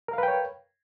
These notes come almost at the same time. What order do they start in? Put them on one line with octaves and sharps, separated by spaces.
A#4 F5 B4 G5 C#5